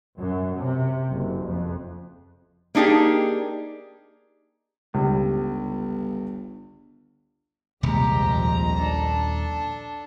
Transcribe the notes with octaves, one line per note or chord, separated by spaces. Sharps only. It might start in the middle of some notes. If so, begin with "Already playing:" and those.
F#2
C3
F#1
F2
A#3 D4 D#4 G4 G#4
G1 C#2 G3
D#1 A#1 F2 C3 G#3 G4 A#5
D4 A4